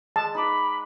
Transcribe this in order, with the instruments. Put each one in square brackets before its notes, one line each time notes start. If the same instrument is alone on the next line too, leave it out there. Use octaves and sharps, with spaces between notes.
[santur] G#3 [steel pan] A5
[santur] D#4 B4 D6 [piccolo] B5